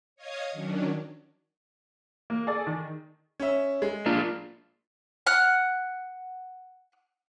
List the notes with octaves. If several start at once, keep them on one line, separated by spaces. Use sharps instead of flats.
C#5 D#5 F5 D#6 G#6
D#3 F#3 C#4 D4
A#3
G#4 A4 D5
D#3
C#4 E5
G#3
A#3 D4 F4
F#5 F6 F#6